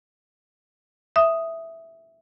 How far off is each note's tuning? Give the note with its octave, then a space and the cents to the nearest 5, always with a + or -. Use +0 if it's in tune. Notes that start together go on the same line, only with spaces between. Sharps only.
E5 +0 D#6 +0